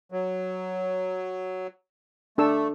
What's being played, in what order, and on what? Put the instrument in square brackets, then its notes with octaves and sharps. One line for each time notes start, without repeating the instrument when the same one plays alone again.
[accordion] F#3
[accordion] A3 [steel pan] D4 A4 E6